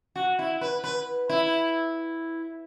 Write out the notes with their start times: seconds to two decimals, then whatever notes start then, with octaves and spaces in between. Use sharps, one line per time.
0.16 F#4
0.39 E4
0.61 B4
0.84 B4
1.30 E4